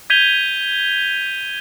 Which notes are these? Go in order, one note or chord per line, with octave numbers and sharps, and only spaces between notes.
G6 G#6 B6 D#7 F7 G7